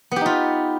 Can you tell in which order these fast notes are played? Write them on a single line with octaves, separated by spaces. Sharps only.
B3 G4 D#4 F4